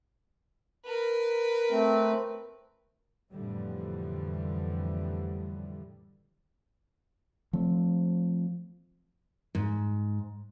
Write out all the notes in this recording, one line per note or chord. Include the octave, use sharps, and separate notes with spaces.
A#4 B4
A3 C4
F2 A2 D3 E3 G3
F3 A3 C4
G#2